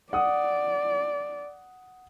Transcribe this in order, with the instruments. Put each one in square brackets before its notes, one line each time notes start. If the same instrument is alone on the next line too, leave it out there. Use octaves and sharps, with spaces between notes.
[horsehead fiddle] D5 [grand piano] F#5 D#6